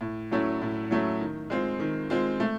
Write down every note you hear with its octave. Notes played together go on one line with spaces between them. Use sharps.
A2
F#3 A3 C#4 E4
A2
F#3 A3 C#4 E4
D#3
G#3 C4 F4
D#3
G#3 C4 F4
A3